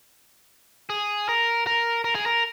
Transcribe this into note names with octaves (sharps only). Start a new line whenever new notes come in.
G#4
A#4
A#4
A#4
G#4
A#4